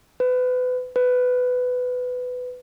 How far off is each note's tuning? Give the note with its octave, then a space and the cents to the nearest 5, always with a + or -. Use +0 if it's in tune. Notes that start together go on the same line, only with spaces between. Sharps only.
B4 +30
B4 +15